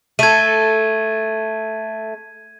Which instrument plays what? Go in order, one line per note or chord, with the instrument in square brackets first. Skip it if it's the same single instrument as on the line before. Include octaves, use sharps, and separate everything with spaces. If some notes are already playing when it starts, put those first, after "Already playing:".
[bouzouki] A3 A4 [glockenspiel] G#6 D#7